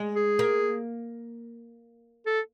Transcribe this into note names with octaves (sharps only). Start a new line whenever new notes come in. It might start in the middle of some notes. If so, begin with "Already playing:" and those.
Already playing: G#3
G#4
A#3
A4